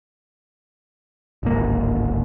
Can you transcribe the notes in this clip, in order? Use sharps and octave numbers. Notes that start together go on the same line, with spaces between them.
D1 G#1 A#3